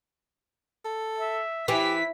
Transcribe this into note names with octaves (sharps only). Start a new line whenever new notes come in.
A4
E5
E3 E4 G4 B6